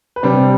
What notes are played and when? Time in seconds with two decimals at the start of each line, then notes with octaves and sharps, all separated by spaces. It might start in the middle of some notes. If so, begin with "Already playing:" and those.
0.16 B4
0.23 C3 G3 D4 C5